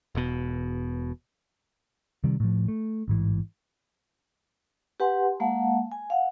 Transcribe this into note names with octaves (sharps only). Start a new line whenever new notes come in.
E1 B2
C3 D#3 G3
A2 F3
A3
A1 G#2 E3
G4 B4 F#5 G#5 C6
G#3 A#3 F5 F#5 A5
G#5
F5 F#5